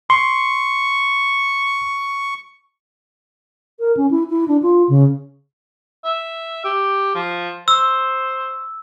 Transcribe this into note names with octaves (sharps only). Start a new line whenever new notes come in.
C6 C#6
A#4
C#4
E4
E4
D4
F4
C#3
E5
G4
F3
C5 E6